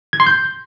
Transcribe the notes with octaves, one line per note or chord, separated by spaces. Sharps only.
G#6
C6
G6